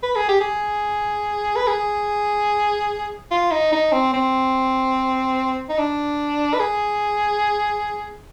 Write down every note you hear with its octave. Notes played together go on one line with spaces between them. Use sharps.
B4
G#4
G4
G#4
B4
G#4
F4
D#4
D#4
C4
C4
D#4
D4
B4
G#4